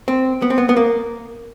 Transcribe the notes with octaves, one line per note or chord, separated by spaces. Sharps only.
C4
B3
C4
B3
B3
A#3